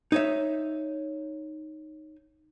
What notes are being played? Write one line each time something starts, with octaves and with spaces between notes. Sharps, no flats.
D#4 C#5 E5